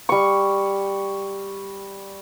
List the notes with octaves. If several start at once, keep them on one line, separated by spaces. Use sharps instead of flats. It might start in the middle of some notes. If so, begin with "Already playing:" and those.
G3 C#6